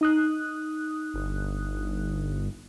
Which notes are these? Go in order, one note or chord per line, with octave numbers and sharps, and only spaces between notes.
D#4 D#6 F#6
G1